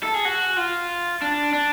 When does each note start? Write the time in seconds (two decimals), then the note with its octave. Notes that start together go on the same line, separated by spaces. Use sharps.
0.03 A4
0.14 G#4
0.25 F#4
0.57 F4
1.22 D4
1.54 D4